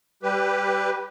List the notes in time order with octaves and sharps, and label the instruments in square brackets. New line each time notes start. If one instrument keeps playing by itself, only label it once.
[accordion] G3 G4 B4